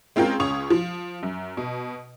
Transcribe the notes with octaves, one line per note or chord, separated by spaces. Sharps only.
G#3 C4 C#4 F4 A#4 G5
C#2 C#4 C#6 D#6 F7
F3
F#2
B2